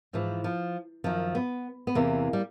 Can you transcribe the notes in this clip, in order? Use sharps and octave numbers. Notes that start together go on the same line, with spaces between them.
G#2 E3 F3
F3
F#2 D#3 F3
B3
B3
E2 C3 E3 A#3
G3